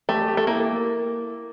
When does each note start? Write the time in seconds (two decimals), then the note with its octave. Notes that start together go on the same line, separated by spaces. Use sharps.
0.09 A3 G4
0.28 G4
0.37 A3
0.47 A#3 E4